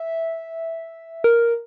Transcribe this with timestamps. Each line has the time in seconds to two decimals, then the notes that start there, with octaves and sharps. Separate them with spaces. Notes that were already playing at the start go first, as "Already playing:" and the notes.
Already playing: E5
1.24 A#4